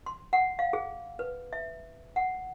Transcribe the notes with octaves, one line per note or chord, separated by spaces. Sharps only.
C6
F#5
F5
G#4
B4
E5
F#5